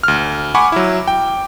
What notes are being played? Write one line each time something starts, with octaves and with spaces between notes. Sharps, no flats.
D2 F6
F#5 G#5 B5 C#6 D6
F#3 E4
G5